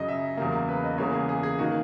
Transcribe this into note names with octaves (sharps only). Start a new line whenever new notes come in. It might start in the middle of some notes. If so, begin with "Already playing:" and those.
Already playing: F#2 C#3 F#3 D#5
E5
E2 C#3 F#3 A#3
B4
D#5
E2 C#3 E3 A#3 C#5
G#4
G#4
G#4
D#3 A#3 F#4